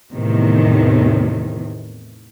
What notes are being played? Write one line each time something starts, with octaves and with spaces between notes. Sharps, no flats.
E2 A2 C3 D#3